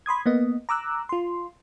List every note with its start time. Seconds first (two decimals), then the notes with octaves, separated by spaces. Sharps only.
0.06 B5 C6 D#6 G#6
0.26 A#3 B3 D#5
0.69 A#5 D6 E6 F#6
1.09 F4 C6